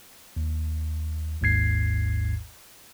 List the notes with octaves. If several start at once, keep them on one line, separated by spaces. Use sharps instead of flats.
D#2
G#1 D#2 G#2 G#6 C7